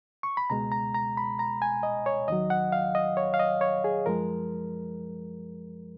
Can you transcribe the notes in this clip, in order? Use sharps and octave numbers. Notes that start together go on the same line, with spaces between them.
C#6
B5
C#2 B2 G#3 A#5
A#5
A#5
B5
A#5
G#5
D#5
C#5
D#2 D#3 F#3 D#5
F#5
F5
D#5
C#5
F5
D#5
C#5
G#4
F#2 F3 G#3 A#4